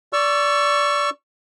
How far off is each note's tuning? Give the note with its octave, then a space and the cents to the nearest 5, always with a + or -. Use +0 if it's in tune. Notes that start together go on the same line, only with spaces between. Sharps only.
D5 -15 C#6 +0 E6 +25